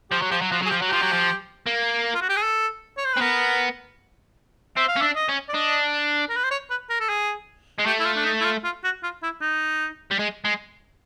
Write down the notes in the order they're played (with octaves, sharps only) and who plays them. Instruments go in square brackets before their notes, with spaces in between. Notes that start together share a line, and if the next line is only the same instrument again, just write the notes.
[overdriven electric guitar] F3 [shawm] G4
[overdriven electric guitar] F#3
[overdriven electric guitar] F3 [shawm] G4
[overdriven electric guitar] F#3
[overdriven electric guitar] F3 [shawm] F#4
[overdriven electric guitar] F#3 [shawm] G#4
[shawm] G4
[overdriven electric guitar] F3
F#3
[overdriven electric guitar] F3 [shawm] G4
[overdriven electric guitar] F#3
F3
A#3
[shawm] F4
F#4
G4
G#4
A4
C#5
C5
B4
[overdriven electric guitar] C4
[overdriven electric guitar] B3 [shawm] A#4
[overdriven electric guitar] C4 [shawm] E5
[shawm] F5
[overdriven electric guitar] C#4
[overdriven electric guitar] D4 [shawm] E5
[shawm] D#5
[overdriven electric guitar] C#4
[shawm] D5
[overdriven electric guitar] D4 [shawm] D#5
[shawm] A#4
B4
C5
C#5
B4
A#4
A4
G#4
[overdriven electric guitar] G#3
[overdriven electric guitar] A3 [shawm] G4
[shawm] E4
F4
D4
D#4
E4
F4
F4
F#4
F4
E4
D#4
[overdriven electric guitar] G3
G#3
G#3